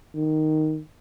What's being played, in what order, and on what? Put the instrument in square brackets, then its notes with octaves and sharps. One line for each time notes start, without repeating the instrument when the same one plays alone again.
[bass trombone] D#3